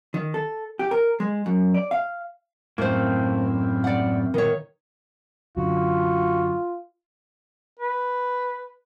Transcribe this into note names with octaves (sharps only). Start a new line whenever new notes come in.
D#3
A4
G4
A#4
G#3
F#2
D5
F5
F#2 A2 A3 A#3 C4 E4 C5
D5 F#5
A#2 D#3 B3 E4 C#5
F#2 D3 F4 F#4
B4